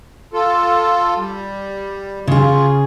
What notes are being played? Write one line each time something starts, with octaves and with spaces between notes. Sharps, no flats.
F4 A4
G3
C#3 F4 G#4